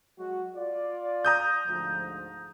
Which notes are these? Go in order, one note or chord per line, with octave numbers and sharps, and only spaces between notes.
F#3 G#3 F#4
F4 D5
A#5 D#6 G6
D2 G#2 F3